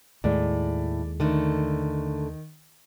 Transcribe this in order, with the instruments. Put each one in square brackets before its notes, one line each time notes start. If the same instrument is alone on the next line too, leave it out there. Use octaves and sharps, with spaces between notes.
[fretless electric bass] D#2 G#3 [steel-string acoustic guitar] A2 [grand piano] D5
[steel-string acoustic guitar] D3 A3 [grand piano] D#3